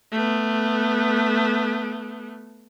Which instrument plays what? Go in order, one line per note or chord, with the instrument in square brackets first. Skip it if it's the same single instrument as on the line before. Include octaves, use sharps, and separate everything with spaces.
[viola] A3 B3